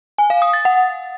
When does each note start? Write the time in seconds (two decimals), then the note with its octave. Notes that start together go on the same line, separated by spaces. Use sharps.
0.18 G#5
0.30 F5
0.42 D#6
0.53 A6
0.65 F#5